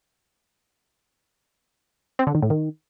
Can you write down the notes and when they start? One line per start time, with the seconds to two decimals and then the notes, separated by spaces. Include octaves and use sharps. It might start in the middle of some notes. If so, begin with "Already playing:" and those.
2.19 C4
2.27 D3
2.35 D#3
2.42 A2
2.50 D#3